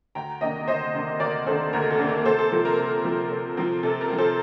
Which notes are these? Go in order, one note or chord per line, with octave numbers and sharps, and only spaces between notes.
D2 G5 A#5
C3 D#3 A#3 D4 D#5 G5
D2 C5 D#5
C3 D#3 A#3 D4
D2 A#4 D5
C3 D#3 A#3 D4 A4 C5
D2 A#4
A4
C3 D#3 A#3 D4
A#4
C3 A4 C5
A4
F3 C4 A4
A#4
C3
F3 C4
C3
F3 C4
C3 A4
A#4
F3 C4
A4 C5